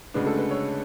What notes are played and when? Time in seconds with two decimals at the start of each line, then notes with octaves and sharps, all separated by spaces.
0.14 D2 C#3 G#3 D4 B4
0.26 A4
0.38 B4
0.51 C#5